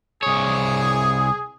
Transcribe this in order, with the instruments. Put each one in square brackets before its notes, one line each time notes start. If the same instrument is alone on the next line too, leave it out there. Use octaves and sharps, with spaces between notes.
[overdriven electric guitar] C2 C#5 [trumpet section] G#4